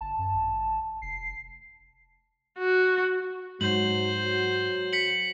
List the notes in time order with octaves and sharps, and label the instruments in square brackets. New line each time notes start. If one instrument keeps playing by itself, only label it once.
[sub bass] G1 [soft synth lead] A5
[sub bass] F#2
G#1
[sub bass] F1 [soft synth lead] C7
[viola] F#4
[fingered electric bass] G#2 [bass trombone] F#3 [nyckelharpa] C5 [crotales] F#7
[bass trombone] F#3
[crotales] B6 C#7 F#7